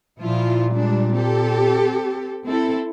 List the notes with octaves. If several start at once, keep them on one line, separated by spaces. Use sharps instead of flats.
A#2 F3 E4 F4
G3 G#3 D4
C4 G4 A4
C4 E4 A4